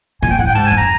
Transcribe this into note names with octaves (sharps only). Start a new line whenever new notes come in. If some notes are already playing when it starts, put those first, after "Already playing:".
A#2 G#5
G5
A2 F#5
G5
G#2 A5
G#5
F2
A#5